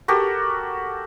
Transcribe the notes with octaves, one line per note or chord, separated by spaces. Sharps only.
F#4 G4 A4 A#4